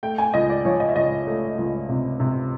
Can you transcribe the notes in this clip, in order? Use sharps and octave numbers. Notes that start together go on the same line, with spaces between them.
A3 G5
G#5
C#2 D#5
D5
F3 C#5
D#5
E5
C#2 D#5
A3
C#2
C3
C3